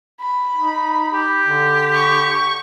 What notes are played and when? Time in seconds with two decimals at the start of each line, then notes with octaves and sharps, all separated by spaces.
0.21 B5
0.56 D#4
1.14 G4
1.47 D3
1.95 C#6